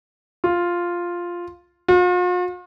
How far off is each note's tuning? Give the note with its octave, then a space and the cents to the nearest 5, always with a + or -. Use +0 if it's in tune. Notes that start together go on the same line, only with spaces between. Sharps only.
F4 +0
F4 +45